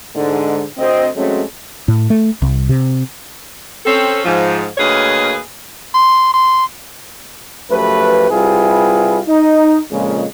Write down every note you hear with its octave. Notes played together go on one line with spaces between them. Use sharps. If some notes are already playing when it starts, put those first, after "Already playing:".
G#2 D3 G#3
D2 C4 D#5
F#3 G#3 A3 C4 C#4
A2
A3
C2
C3
C4 C#4 A4
G#2 F3
D2 A#3 G#4 B4 C#5 D#5
C6
C6
F#2 F3 A3 G4 B4
C3 G3 E4 F4 G#4 B4
D#4
F2 A#2 C#3 G#3